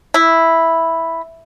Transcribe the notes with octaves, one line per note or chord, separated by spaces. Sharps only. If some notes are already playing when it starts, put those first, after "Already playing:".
E4